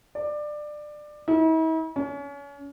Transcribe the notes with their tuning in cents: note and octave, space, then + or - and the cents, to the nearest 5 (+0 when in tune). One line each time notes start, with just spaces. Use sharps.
D5 +20
E4 -45
C#4 +35